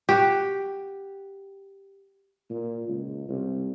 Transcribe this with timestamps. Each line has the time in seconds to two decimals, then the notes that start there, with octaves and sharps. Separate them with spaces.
0.09 F#4 G4
2.50 A#2
2.88 C#2
3.28 C2